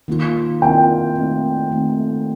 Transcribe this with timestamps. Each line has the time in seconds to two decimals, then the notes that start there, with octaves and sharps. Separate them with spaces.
0.08 D#3 A#3 F4
0.62 D#3 A#3 F4 G5
1.17 D#3 A3 C4
1.71 D#3 A3 C4